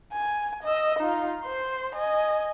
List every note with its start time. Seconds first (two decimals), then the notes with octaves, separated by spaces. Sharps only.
0.13 G#5
0.63 D#5 E6
0.99 D#4 F4
1.42 C5 C6
1.95 D#5 G#5